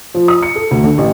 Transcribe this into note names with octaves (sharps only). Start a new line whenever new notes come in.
F3
D#6
C#7
A4
D2
D3
A1